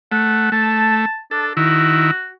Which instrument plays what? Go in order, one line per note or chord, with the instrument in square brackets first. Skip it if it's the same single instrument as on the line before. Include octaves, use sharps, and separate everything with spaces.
[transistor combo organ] A3 [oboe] F#5
[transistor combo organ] A3 [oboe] A5
[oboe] D4 [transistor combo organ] A4
[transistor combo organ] D#3 E4 [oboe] F#4